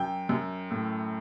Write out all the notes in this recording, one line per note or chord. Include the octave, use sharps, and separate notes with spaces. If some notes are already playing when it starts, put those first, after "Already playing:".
Already playing: F#2 G5
F#2
A2